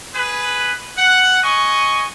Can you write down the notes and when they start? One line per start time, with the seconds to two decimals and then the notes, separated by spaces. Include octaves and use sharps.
0.15 G#4 B4
0.97 F#5
1.43 D#5 G#5 C#6